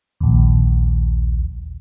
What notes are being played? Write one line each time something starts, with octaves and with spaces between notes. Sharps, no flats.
A#1 D#2